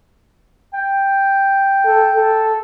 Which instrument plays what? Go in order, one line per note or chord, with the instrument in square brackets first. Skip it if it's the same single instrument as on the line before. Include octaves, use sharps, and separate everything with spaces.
[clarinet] G5
[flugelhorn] A4
A4